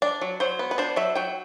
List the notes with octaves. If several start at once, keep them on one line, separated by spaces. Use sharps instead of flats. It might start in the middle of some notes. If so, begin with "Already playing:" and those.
D4 D5
F#3
F#3 C5
B3
B4
D4 C5
F#3 E5
F#3 G5